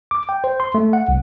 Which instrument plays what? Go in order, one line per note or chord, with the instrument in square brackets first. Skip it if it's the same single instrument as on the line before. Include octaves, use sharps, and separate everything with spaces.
[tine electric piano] D6
G5
C5
C6
A3
F#5
C2